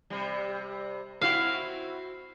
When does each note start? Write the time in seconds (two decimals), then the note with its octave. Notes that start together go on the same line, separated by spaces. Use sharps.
0.10 C3 G3
1.21 C4 E4 F#4 F5